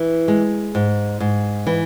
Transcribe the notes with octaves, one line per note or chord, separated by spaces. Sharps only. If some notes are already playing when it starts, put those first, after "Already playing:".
Already playing: E3
G#3
G#2
G#2
E3